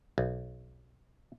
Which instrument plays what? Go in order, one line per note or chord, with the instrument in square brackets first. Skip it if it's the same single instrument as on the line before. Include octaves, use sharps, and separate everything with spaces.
[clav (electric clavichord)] B1